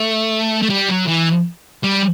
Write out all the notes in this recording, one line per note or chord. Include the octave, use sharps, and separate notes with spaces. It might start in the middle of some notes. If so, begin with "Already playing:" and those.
Already playing: A3
A3
G3
F#3
E3
G3